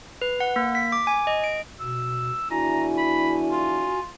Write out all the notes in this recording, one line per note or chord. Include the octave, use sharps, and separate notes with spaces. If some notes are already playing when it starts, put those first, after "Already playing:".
B4
F#5
A#3
B6
D6
G#5
D#5
D7
B2 E6
E2 D4 E4 F#4 G#5 A#5
B5
F4